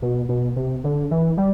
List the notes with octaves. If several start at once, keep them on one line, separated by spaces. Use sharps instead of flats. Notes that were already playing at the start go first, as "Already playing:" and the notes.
B2
B2
C3
D3
E3
G3